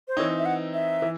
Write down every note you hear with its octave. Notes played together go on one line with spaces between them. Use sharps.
C5
E3 C4 D#4 C#5
E5
F#5
E5
E3